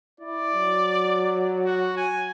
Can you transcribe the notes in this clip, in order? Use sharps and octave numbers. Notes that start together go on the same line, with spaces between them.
E4 D5
F#3
F#4
G#5